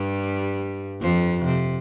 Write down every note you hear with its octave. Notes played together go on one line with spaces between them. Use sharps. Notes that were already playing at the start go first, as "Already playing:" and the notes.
Already playing: G2 G3
F2 F3
C3